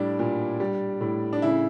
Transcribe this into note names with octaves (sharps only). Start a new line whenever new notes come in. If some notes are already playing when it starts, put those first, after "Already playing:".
Already playing: A2 G3 D4
A#2
G3
A2
D4
C#3 E4